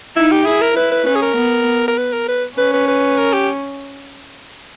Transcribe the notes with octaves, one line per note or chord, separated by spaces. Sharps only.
D#4 E4
G4
E4 G#4
A#4
E4 B4
B4
C#4 B4
G#4
A#4
B3
A#4
B4
A#4
B4
C#4 B4
B4
B4
A#4
G4